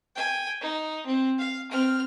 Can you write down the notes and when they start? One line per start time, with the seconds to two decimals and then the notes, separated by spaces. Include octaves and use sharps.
0.16 G5 G#5
0.61 D#4
1.07 C4
1.38 F5
1.71 C4 F6